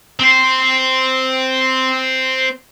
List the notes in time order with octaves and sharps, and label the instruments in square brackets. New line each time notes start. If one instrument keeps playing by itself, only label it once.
[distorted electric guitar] C4 C5